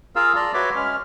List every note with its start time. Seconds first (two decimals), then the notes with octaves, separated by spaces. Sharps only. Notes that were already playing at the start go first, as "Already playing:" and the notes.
0.16 F4 G#4 A#4 F5 E6
0.36 D5 A5 A#5 C6
0.54 F#4 B4 C#5 E5 C6 D6
0.76 G#3 C#4 F6